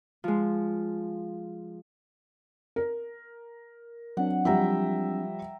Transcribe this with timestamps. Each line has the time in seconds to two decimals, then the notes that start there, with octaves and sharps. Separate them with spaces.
0.24 F3 G#3
2.76 A#4
4.17 F#3 C4 D4 F#5
4.45 F3 G3 E5 G5 A#5